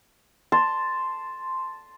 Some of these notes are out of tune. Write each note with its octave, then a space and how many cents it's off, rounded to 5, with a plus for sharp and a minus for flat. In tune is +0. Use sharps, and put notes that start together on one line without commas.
A5 +0 C6 +0